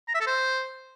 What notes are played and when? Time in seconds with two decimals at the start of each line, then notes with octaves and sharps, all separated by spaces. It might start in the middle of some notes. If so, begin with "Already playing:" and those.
0.08 A#5
0.14 E5
0.21 A4
0.27 C5